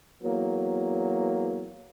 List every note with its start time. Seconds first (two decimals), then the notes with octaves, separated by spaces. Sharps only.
0.22 E2 F#3 A#3